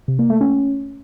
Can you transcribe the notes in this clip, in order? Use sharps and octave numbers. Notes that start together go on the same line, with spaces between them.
C3
A#3
A3
C#4